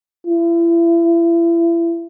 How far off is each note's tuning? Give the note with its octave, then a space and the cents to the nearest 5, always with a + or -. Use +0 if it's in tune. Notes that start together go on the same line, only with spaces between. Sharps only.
E4 +35